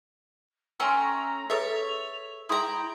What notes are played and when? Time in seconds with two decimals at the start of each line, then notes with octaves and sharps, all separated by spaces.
0.80 A3 C#4 G5 G#5 A#5 C6 E6
1.50 G#4 A4 B4 C#5 E5 A6
1.75 F7
2.49 E4 G#4 G5 A#5 C6 D#6